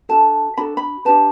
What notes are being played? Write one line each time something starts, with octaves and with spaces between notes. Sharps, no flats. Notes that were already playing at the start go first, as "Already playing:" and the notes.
D4 F#4 A4 A5
D4 F#4 A4 B5
B5
D4 G4 B4 A5